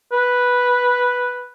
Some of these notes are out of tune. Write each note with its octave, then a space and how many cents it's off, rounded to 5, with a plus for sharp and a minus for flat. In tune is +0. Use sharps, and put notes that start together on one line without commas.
B4 -5